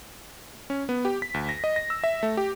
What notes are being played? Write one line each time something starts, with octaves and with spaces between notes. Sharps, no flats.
C#4
B3
G4
B6
D2
A#6
D#5
A#6
E6
E5
A3
G4